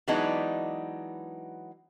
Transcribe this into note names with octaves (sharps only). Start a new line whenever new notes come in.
E3 F#3 G#3 B3 D4 D#4